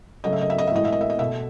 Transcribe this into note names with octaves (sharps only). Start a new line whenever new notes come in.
C#3 F#3 A3 D#5
E5
D#5
E5
D#5
E5
A2 E3 G#3 D#5
E5
D#5
E5
D#5
B2 A3 E5